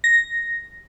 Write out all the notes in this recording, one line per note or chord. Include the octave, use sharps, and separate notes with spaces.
A#6